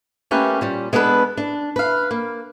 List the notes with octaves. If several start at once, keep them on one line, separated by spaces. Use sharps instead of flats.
A3 A#3 C#4 G4 A#4 B4
A#2 G3 C#4
G#3 B3 D4 A4 B4
D4
B4 F5
A#3